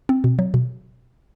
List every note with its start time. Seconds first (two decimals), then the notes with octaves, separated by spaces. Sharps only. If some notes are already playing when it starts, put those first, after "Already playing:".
0.09 C4
0.24 B2
0.39 F#3
0.54 B2